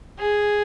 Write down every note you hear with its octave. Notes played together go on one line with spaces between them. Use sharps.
G#4